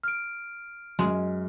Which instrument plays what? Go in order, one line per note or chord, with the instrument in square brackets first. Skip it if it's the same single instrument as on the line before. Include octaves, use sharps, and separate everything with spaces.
[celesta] F6 D7
[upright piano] F#2 [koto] G#3